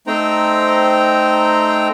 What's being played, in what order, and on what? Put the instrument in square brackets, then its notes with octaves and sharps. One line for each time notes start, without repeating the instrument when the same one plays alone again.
[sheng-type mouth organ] A3 C4 D#4 C5 G5 A#5